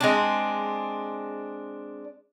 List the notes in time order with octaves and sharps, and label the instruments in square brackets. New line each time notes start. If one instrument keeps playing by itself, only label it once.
[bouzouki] G#3 C4 D4